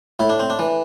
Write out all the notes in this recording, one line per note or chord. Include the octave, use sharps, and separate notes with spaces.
A2 E4
D4
C4
D4
E3